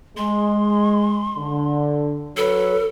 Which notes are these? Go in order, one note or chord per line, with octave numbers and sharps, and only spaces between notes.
G#3 C6
D3
F#3 A4 B4 C#5